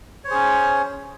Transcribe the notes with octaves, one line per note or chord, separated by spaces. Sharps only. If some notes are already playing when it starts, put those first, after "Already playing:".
C#4 G#4 C5 C#5